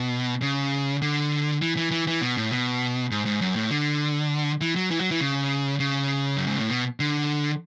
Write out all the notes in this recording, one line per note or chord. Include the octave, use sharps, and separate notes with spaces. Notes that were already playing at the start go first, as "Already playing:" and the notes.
Already playing: B2
C#3
D3
E3
E3
E3
E3
B2
A2
B2
G#2
G#2
F#2
A2
D3
E3
F#3
E3
F#3
E3
C#3
C#3
F#2
G#2
A2
B2
D3